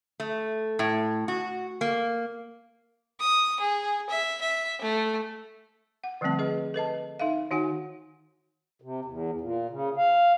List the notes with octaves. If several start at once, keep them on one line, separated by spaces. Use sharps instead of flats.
A3
A2
F#4
A#3
D#6
G#4
E5
E5
A3
F#5
D3 F3 G3 A3 C4 A5
G#4 B4 D#5
A4 B4 D#5 A5
D#4 A4 E5 F5
D#3 D#4 F#4 F#5 G#5
C3
E2
A#2
C#3
F5